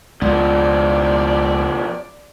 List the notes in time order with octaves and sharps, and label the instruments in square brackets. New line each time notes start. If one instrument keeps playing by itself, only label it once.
[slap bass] C#2 [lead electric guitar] B2 F3 [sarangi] D5